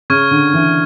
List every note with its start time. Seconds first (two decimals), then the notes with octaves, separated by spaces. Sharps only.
0.10 C#3 C#6 F6 G#6
0.31 D3
0.54 E3